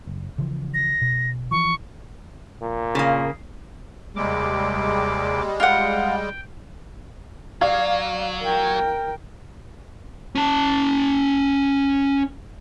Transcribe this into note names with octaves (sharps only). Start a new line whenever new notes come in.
F#1
C#3 E3 F3
A#6
B2
E3 F3 C#6
A#2
C#3 A#3
D#2 C3 G3 G#3 D6
F4 F#5 G5
F#3 D5 F5 G#6
A#4 G5
C#4 A5